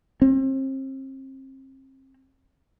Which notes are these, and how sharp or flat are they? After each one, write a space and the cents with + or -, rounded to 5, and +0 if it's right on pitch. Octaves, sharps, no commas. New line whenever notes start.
C4 +35